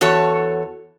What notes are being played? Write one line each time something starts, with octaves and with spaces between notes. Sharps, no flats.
E2 F#4 A4 C#5